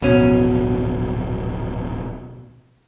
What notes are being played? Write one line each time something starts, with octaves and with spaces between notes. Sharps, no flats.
D1 A#1 B2 C#4